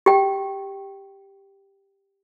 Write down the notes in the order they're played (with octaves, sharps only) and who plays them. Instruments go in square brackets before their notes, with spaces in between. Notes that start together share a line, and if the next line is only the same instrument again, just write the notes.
[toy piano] G4 G5